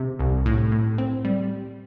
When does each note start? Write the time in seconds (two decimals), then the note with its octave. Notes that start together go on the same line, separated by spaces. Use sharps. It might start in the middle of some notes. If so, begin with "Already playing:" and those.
Already playing: C3
0.19 C2
0.46 A2
0.72 A2
0.98 C4
1.25 G3